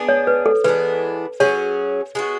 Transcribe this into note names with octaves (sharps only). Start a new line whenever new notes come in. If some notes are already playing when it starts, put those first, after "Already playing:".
Already playing: B3 D4 G#4
C#5
B4
A4
E3 G#3 B3 D4 B4
F#3 C#4 G#4 C#5
G#3 B3 F#4